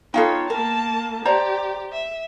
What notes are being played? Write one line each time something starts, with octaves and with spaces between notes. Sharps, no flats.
B3 D#4 F4 A4 C#5 F5 G5
A#3 A#4 A5
G4 C5 D5 A#5
E5